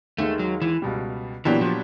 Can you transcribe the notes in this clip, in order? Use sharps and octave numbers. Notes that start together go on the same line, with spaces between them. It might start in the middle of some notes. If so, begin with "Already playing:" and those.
D#2 D#3 G#3 A3
F#3
E3
C#2 B2 G3
A#2 E3 F#3 B3 D4 G4
F3